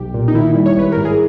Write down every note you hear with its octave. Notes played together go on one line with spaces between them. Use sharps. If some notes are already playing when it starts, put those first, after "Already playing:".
Already playing: B1 G4
A#2
D#4
D#3 E4
G3
C#5
G#1 B4
G#2 A#4
G#4